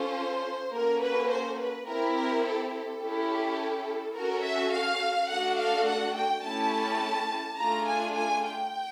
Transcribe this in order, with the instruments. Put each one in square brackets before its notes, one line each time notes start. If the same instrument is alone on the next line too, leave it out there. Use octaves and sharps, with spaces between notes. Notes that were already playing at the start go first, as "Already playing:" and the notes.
Already playing: [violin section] C#4 F4 A4 C5
A#3 C#4 F#4 A4 A#4
B4
C5
B4
C4 E4 G4 A#4
A#4
A4
A4
C#4 E4 G4
C#4 F#4 A4 A#4
E5
F5
A3 D4 F#4 A4 F#5
F5
F#5
G5
A3 C#4 E4 G4 A5
A3 D4 F4 G#4 A#5
G#5
G#5
G5